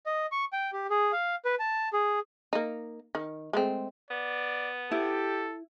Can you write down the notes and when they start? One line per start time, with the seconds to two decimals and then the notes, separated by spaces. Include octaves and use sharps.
0.06 D#5
0.32 C#6
0.53 G5
0.73 G4
0.90 G#4
1.12 F5
1.45 B4
1.59 A5
1.93 G#4
2.53 A#3 D#4
3.15 D#3
3.53 G#3 A3 C4
4.11 B3 D5
4.92 E4 G4 A4